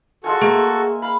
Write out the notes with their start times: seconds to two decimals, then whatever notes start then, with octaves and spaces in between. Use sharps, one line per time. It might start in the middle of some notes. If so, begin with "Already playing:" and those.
0.24 G#3 F4 F#4 A4 G#5 C#6
0.42 A#3 G#4 E5
1.02 F5 B5